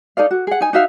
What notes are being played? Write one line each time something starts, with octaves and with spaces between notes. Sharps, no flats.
D#4 A4 D5 F5
F#4
G#4 F#5
D#4 G#5
D#4 F#4 E5 F5